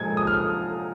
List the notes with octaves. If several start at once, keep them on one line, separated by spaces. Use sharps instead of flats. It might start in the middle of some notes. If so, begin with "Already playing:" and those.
Already playing: A#2 F3 G#3 G#6
D#6
F6